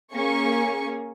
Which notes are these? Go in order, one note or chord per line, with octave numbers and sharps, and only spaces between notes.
A#3 C#4 G#4 G#5 C#6